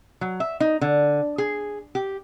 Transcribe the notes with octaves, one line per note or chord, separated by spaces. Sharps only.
F#3
E5
D#4
D3
G#4
G4